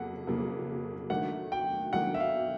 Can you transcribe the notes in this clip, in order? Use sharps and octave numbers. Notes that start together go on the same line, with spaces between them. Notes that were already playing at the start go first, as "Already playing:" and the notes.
Already playing: F2 C#3 F#3 A#3 F#5
F2 C#3 F#3 A#3
D#3 F#3 A3 D4 F#5
G5
D#3 F#3 A3 D4 F#5
E5
F5